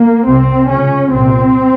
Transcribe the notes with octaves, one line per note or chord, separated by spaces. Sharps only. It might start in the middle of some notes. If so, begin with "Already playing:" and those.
Already playing: A#3
C2 C3 C4
C#2 C#3 C#4
C2 A#2 C4